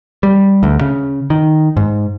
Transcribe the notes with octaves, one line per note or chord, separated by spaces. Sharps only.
G3
D2
C#3
D#3
G#2